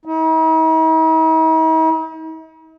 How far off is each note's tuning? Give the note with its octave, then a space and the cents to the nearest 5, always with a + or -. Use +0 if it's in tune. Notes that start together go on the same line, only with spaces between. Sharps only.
D#4 +45